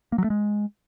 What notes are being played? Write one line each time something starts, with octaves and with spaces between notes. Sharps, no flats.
A#3
F#3
A3
G#3